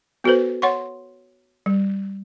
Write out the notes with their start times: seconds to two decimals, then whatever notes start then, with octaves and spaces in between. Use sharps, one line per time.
0.24 B3 F#4 A4 B4 C5
0.62 C#5 F#5 C6 C#6
1.66 G3